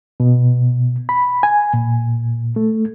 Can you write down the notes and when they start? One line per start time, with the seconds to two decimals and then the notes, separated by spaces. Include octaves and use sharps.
0.20 B2
1.09 B5
1.43 G#5
1.74 A#2
2.56 A3